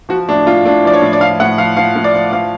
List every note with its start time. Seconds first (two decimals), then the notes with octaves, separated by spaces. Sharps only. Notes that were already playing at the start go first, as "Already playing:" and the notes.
0.09 F3 F#4
0.28 A2 D4
0.46 A2 F4
0.65 A2 D4
0.84 F3 D5
0.93 C#5
1.02 A2
1.13 D5
1.20 F3 F5
1.40 A2 F#5
1.58 F3 F5
1.77 F3 F5
1.95 A2
2.04 D5
2.14 F3
2.33 F3 F5